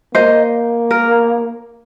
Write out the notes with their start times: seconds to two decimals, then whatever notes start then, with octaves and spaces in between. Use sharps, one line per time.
0.14 A#3 C5 D#5
0.91 A#4